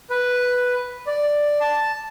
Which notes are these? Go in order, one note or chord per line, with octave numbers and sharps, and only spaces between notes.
B4
D5
A5